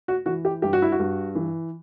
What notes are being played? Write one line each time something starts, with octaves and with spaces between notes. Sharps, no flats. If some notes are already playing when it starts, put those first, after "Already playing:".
F#4
E3 F#4
G4
G2 G4
F#4
E4
F#4
G2
E3